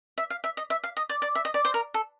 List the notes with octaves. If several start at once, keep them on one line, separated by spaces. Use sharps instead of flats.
E5
F5
E5
D#5
E5
F5
D#5
D5
D5
E5
D#5
D5
C5
A#4
A4